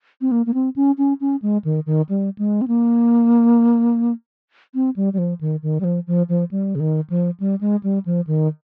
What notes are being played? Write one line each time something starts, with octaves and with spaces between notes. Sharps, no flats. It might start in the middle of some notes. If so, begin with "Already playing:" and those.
C4
A#3
A#3
C4
C#4
C#4
C#4
G#3
D#3
D#3
G3
G#3
C4
A#3
C4
G3
G3
F3
D#3
D#3
G3
F3
F3
F3
G3
C#3
D#3
F3
G3
G#3
G3
F3
D#3